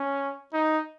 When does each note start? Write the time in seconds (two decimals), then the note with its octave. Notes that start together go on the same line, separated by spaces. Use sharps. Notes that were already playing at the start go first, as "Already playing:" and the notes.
Already playing: C#4
0.53 D#4